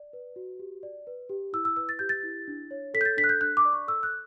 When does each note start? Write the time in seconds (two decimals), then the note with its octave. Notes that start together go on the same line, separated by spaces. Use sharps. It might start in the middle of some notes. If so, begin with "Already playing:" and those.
Already playing: D5
0.13 B4
0.36 F#4
0.59 G4
0.83 D5
1.07 B4
1.29 G4
1.53 E4 E6
1.65 E6
1.76 B4 E6
1.89 A6
1.99 G4 G6
2.09 A6
2.23 E4
2.48 D4
2.71 C#5
2.94 A4 B6
3.01 G6
3.05 A6
3.17 D4 B6
3.24 F#6
3.29 G6
3.41 D4 F#6
3.57 D6
3.65 D5
3.73 C#6
3.88 A4 E6
4.03 F#6